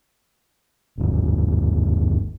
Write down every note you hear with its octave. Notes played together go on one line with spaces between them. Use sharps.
G1 D#2